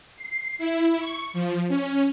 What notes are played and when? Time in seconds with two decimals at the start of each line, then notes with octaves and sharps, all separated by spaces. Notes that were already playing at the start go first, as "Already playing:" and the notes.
0.17 C7
0.58 E4
1.00 C#6
1.33 F3
1.68 C#4